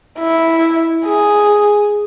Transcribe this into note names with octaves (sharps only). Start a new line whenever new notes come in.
E4
G#4